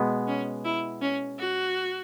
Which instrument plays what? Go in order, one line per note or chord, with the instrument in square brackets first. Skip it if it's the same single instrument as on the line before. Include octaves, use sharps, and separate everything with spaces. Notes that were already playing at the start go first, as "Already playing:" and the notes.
Already playing: [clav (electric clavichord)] B2 G#3 B3
[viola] C#4
E4
C#4
F#4